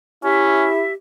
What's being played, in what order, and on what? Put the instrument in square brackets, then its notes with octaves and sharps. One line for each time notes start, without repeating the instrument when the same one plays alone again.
[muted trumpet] C#4 [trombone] E4 [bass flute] G4 [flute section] E5